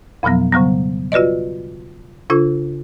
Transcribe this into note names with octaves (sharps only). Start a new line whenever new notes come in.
F2 B2 F3 F#3 B3
C#3 F#3 G3 B3
F4 F#4 B4 D5 D#5
C#3 D4 F4 A4